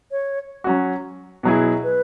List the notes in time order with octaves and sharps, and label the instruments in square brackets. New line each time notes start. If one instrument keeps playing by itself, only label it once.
[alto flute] C#5
[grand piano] F#3 C#4 F#4
B2 F#3 E4 G#4
[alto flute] B4